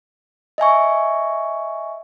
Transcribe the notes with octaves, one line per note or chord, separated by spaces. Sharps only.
D#5 E5 G#5 C#6